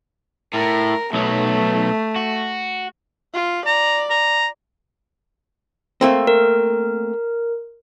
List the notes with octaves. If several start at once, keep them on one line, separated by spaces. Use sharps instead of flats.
A2 A#4
B1 F#3 A3
F#4
F4
D5 A#5
A#5
A3 A#3 C4
A#4